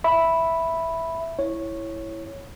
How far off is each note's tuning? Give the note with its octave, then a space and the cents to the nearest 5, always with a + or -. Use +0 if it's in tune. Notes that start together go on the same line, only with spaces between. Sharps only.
E5 +0 B5 +0
E4 +0 C#5 -10